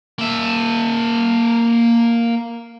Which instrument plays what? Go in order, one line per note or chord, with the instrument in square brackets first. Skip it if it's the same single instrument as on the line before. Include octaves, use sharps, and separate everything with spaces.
[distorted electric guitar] A#3 E5